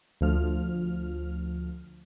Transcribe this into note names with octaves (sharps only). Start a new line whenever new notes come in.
D2 F3 F6